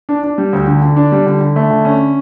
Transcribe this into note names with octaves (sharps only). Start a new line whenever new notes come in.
D4
D4
G3
D2
D3
D3
D4
G3
D3
D3
A3
D3
C#4